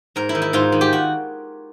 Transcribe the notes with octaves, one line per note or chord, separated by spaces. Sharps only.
G#2 A#4
E4
D#3
E4
G#2 F4
D#3
G4
F#4